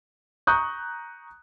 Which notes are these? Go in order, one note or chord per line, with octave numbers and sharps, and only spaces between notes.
A#5 C#6 D#6 F#6 G6